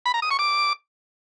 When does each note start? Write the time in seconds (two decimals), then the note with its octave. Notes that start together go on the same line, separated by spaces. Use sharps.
0.06 B5
0.14 A#5
0.22 D#6
0.31 C#6
0.39 D6